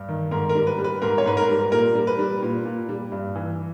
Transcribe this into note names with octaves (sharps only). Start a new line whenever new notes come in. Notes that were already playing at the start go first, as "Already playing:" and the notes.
Already playing: G2
D#3
G#2 A#4
A#4
G3
B4
G3
B4
G#2 A#4
C#5
G#2 B4
A#4
G3
A#2 A#4
G3
B4
G3
A#2
A#2
G3
G2
E3